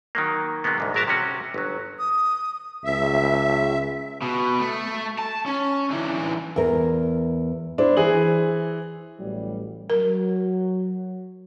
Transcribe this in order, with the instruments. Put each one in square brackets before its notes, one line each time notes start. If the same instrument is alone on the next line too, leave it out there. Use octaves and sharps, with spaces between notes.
[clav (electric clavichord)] D#3 F#3 A#3
C3 D#3 F#3 G#3 A#3 B3
C2 G#2 D3
G#1 F#3 A#4 E5 A5 A#5
C3 G3 C#4 F#4
G1 F#3
[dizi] D#6
[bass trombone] C#2 [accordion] E5
[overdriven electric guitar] B2
A3
A5
C#4
D3 E3
[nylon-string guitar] E2 A#4
[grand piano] D4 E4 [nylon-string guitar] C5
[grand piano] E3 G#4 F#7
[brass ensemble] A1 F#3 G3
[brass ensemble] F#3 [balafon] A#4